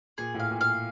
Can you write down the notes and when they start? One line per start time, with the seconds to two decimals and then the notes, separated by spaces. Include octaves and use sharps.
0.18 A#2 G#4
0.34 A2
0.40 F5
0.51 A#2
0.61 F5